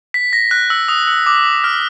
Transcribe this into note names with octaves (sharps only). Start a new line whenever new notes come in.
B6
A#6
F#6
E6
D#6
E6
D6
F6